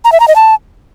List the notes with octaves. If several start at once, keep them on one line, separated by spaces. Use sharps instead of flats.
A#5
E5
A#5
D#5
A5